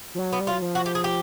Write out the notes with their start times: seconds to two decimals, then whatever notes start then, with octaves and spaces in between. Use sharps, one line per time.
0.15 F3
0.19 F#3
0.32 B3
0.40 G3
0.47 F4
0.51 F#3
0.62 F3
0.75 F#4
0.86 G4
0.95 G#4
1.04 G4